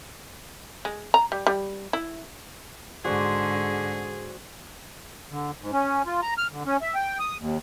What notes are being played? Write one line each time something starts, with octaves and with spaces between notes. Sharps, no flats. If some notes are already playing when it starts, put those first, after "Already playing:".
G#3
A#5
G3
G3
E4
G#2 D3 F#4 G#4 C5 D5
D3
G#2
C#4
F4
A#5
F6
D3
C#4
E5
G5
D#6
D#2